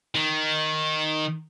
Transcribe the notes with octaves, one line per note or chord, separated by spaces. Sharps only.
D#3